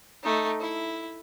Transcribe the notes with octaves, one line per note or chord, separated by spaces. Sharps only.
A3 D#4
E4